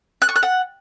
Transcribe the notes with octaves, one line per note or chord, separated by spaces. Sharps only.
F#6
C#6
F#6
F#5